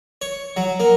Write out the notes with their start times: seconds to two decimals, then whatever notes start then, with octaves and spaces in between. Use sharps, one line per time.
0.22 C#5
0.57 F#3
0.80 A#3